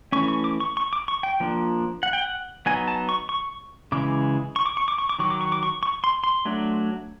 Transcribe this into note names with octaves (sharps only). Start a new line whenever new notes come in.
E3 A3 C#4 C#6
C#6
D6
C#6
C#6
D6
C#6
G5
F3 A#3 D4
F#5
G5
F#5
F#3 B3 D#4 G#5
A5
C#6
C#6
C#3 E3 G#3 D6
C#6
D6
C#6
D6
C#6
D6
D#3 F#3 C#6
D6
C#6
D6
C#6
C#6
C6
C6
F#3 A3 D4